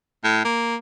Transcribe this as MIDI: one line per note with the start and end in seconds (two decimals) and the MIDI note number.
0.24 0.41 45
0.45 0.76 58